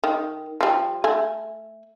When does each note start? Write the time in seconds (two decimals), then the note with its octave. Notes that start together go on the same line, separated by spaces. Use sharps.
0.04 D#3
0.61 F3 G3
1.04 A3 G#5